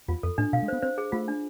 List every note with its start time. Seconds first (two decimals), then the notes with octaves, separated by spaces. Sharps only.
0.08 E2 F4
0.23 F2 A4
0.38 A2 D4
0.53 B2 F5
0.63 G#3
0.68 B3 C5
0.82 C4 C5
0.98 G#4
1.12 A3 F4
1.28 D4